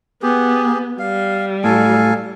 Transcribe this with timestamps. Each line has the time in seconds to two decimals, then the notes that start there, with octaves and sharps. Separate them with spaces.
0.22 B3 G4 G#4
0.99 G3 F5
1.64 A2 A4 F5 G#5